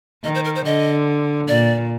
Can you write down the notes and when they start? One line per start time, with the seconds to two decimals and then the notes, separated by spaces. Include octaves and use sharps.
0.24 D#3 D#5
0.35 C5
0.45 A#4
0.55 C5
0.65 D3 D#5
1.48 A#2 D5